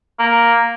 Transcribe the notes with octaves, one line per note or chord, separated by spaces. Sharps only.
A#3